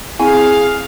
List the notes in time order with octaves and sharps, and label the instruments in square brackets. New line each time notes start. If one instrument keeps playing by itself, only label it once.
[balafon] C4 E4 [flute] G#4 [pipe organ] F5 [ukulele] G#5